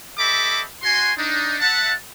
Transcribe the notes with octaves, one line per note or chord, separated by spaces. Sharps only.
G4 A4 D#5 E5 B5 D6
F#4 G#5 C6
D4 D#4
E5 F#5 A5